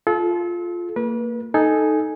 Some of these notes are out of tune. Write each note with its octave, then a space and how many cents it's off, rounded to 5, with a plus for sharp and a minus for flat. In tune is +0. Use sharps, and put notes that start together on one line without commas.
F4 +0 A4 -35
A#3 -20 B4 -35
D#4 +0 A4 -10 G#5 +0